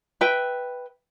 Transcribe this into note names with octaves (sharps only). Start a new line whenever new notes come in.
B4 E5 G5